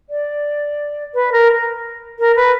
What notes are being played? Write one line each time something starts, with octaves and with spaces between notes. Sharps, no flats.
D5
B4
A#4
A#4
B4